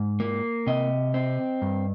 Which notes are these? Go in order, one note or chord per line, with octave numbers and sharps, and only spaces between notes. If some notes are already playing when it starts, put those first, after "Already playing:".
Already playing: G#2
A#3
C3 D#5
C4
G2